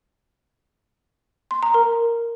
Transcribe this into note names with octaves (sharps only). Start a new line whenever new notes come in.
C6
A#5
A#4